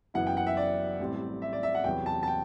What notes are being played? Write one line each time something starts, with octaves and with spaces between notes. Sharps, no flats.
F#1 F#2 E3 B3 E4 F#5
G5
F#5
E5
D5
A1 A2 G3 C4
E5
D5
E5
F#5
E2 C3 F#3 B3 G5
A5
A5
G5